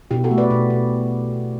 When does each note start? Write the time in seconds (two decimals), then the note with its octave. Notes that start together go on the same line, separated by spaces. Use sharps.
0.11 B2 E4 G4
0.24 F#4 A4
0.31 A3
0.38 B4 D5
0.50 B2
0.70 B2